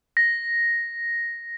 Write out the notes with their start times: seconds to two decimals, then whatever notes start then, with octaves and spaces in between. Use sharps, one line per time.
0.17 A#6